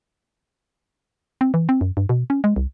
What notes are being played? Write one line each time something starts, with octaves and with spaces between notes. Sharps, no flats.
C4
E3
C4
F#2
G2
B2
C#4
G#3
C2